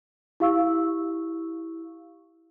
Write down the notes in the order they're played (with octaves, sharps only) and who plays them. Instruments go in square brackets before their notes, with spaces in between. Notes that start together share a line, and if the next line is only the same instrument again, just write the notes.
[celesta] E4 G4 F5 C#6 E6